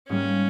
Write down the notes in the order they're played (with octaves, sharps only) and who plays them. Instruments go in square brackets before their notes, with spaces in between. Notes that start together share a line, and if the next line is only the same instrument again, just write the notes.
[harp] G#2 G3 A#3 [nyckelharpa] C#4